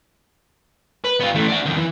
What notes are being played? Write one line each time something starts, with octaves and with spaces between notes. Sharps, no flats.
B4
B3 F4
E3 A3
D4 F#4
F2 D#3
E3